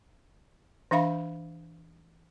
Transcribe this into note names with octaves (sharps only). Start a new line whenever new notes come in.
E3 D4 E5 F5 B5